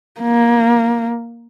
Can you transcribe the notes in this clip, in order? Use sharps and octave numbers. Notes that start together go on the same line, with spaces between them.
A#3